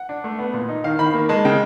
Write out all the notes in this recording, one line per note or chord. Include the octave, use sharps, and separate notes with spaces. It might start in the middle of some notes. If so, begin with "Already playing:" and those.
Already playing: F#5
D4
A3
B3
A#2
D#4
D#3 F5
D#3 B5
A#3
G#3 A5
C#3 G5